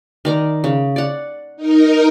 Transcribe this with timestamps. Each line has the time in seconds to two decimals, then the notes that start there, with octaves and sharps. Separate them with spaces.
0.25 D#3 D5 A#5
0.64 C#3
0.96 D5 F#5
1.56 D#4 A#4